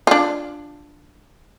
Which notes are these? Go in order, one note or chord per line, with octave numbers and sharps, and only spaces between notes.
D4 F4